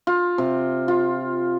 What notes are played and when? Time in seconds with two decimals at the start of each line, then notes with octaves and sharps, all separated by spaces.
0.07 F4
0.38 C3
0.88 F4